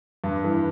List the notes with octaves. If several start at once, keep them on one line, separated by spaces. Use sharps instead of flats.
G2
E3